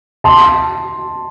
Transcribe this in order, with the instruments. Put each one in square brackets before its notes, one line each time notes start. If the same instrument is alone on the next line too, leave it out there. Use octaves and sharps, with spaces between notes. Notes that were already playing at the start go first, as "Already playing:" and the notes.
[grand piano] A5 C6